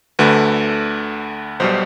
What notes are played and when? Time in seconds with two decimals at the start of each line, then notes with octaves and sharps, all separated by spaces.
0.19 D2 D3 A3 B4
1.60 B1 B2 G3 C5